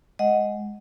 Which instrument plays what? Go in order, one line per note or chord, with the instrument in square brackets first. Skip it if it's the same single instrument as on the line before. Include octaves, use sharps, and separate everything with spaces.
[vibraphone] G#3 D#5 F#5